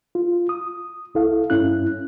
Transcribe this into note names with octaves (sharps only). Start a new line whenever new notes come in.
F4
D#6
C2 E4 A4 F5
G2 C#4 E4 F#6